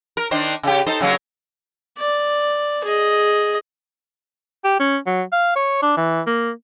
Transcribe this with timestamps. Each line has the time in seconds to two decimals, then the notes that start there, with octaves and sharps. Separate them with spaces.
0.17 A#4
0.31 D#3 D4 C5
0.63 C#3 G4
0.86 D#4 A4 C5
1.01 C#3 F#3 A#3
1.98 D5
2.84 G#4 D#5
4.64 G4
4.79 C#4
5.06 F#3
5.32 F5
5.56 C#5
5.82 D4
5.97 E3
6.27 A#3